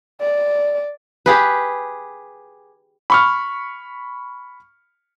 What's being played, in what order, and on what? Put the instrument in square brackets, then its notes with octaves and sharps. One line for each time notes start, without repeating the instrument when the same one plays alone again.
[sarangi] D5
[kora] G4 G#4 B4
[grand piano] B5 C#6 F6